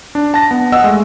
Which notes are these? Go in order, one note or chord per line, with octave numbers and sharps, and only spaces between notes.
D4
A5 A#6
B3
D#5 F#5 E6
G#3 A3